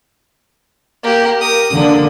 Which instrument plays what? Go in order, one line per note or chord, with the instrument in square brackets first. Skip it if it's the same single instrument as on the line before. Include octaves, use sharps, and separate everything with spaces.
[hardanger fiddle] A#3 G4
A#4 D#6
[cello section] D3 [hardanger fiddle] A#3